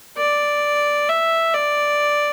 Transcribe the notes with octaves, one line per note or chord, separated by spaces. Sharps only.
D5
E5
D5